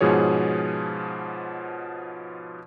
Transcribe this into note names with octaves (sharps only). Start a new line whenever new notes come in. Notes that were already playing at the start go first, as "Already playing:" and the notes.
G#2 B2 F3 G#4 C#5